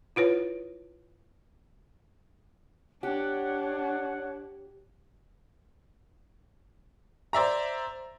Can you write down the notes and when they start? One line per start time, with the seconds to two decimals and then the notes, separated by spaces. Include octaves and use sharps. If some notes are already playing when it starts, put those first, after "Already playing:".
0.16 E4 F4 B4 C#5
3.03 D4 G4 C#5 F#5
7.33 C5 D5 E5 A#5